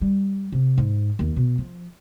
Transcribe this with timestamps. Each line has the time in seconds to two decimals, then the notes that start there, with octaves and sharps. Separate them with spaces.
0.01 G3
0.52 C3
0.78 G#2
1.19 D#2
1.36 B2
1.58 F3